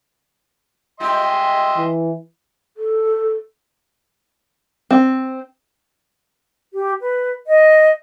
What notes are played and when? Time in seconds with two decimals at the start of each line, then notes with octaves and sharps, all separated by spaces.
1.00 G#3 F4 G4 D#5 E5 C6
1.77 E3
2.77 A4
4.91 C4
6.74 G4
7.01 B4
7.47 D#5